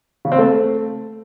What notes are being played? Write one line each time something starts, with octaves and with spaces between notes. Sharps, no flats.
C#3
C4
A3